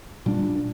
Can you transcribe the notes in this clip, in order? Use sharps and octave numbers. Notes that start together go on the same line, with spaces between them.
A#2 G3 D4